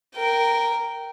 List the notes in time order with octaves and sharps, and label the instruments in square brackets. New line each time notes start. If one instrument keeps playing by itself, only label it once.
[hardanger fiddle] A#4 G5